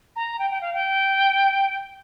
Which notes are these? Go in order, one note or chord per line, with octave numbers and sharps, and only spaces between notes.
A#5
G5
G5
F5
G5